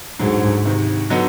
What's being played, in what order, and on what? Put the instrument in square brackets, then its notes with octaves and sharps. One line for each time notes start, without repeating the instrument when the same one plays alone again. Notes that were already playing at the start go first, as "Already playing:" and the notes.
[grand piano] D2 D3 F#3 [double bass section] G#2
[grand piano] D2 C3 D#3
D3 F#3 B3 D#4